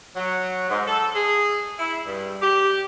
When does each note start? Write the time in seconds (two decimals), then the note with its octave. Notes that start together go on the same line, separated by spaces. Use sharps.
0.17 F#3
0.70 G#2
0.88 A4
1.16 G#4
1.80 E4
2.06 G2
2.42 G4